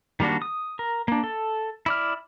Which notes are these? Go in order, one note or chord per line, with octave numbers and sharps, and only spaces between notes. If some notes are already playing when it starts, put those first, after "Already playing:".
D#3 G3 A#3 D4 F#4
D#6
A#4
A#3 D4
A4
E4 D5 F6